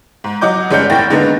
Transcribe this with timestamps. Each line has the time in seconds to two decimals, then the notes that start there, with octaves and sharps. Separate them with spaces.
0.24 G#2
0.41 F#3 F#4 D#5 D6 G6
0.71 G1 G#3 C#4 D5 F#5 G6
0.90 F1 A2 D#3 G5 A6 A#6
1.10 D3 D#3 G#3 A#3 B3 D#4